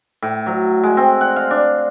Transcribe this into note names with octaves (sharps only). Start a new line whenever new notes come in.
A2
F#3
G#3
C4
F#5
F5
D4